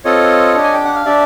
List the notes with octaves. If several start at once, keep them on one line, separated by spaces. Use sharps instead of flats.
C4 F4 A4 C#5 D#5
D4 G4
G#5
G5
F#5
F5
D4 G4 D5 E5